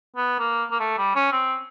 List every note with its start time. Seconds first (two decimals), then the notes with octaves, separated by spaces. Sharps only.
0.16 B3
0.39 A#3
0.71 A#3
0.80 A3
0.98 G3
1.16 C#4
1.32 C4